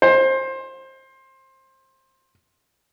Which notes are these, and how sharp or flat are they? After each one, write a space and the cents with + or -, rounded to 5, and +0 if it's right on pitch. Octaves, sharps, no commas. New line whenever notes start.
C5 +20